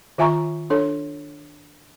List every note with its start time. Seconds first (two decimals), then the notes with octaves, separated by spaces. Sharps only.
0.18 D#3 F4 E5 G#5 A#5 C#6
0.70 D4 A4 C#5